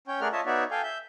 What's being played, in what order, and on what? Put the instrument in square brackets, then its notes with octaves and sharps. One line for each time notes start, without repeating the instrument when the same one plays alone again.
[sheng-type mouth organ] C#4 C#5 G5
A3 G#4 A#4 D5 F#5 F6
F4 C#5 D#5 E5 A5
B3 D#4 F#4 C#5 D5 E5
A4 F5 G5 G#5
E5 G6